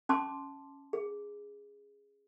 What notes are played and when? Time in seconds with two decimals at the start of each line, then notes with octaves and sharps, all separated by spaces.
0.09 C#4 A5 C6 D6
0.93 G#4